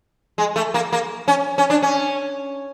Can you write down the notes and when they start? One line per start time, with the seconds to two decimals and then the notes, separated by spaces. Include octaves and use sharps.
0.38 G#3
0.56 A3
0.74 A#3
0.93 A#3
1.28 C#4
1.58 C#4
1.70 D4
1.82 C#4